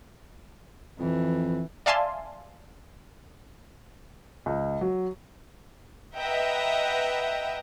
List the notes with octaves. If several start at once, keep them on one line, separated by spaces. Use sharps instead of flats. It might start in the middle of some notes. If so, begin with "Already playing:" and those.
F2 E3
D5 E5 F5 G#5 A5 C6
C#2
F#3
B4 D#5 E5 F#5 G5 A#5